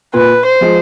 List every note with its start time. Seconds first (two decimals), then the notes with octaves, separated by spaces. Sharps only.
0.13 A#2 B4
0.45 C5
0.61 F3 G#3